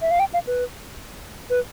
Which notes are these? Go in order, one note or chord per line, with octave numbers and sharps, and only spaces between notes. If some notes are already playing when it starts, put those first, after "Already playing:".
E5
F5
G5
F5
B4
B4